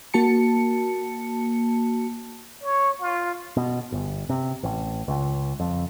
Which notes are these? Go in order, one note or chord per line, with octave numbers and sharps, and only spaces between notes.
A#3 F#4 A5 C#7
C#5
F4
B2
G1
C3
A1
C#2
F2